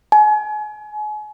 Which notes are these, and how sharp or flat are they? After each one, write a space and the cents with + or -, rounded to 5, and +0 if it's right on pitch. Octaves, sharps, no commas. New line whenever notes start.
G#5 +35